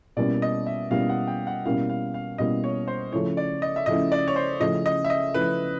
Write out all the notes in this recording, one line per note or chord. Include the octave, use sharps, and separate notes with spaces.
B2 G3 A#3 C#4 E4 D5
D#5
E5
B2 G3 A#3 C#4 E4 F5
F#5
G5
F#5
B2 G3 A#3 C#4 E4 F5
F5
F5
B2 G3 A#3 C#4 E4 D#5
C#5
C5
C#3 F3 A3 C#4 E4 C#5
D5
D#5
E5
C#3 F3 A3 C#4 E4 D#5
D5
C#5
C5
C#3 F3 A3 C#4 E4 D#5
D#5
E5
D#5
C#3 F3 A3 C#4 E4 B4